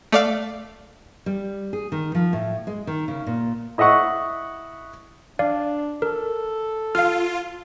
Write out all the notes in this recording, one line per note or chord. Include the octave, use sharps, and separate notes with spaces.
A3 D5 F5
G3
G#4
D#3
F3
A2
G#3
D#3
C#3
A#2
E4 D#5 E5 F#5 C#6
D4 D5 F5
A4 A#4
F4 F5 F6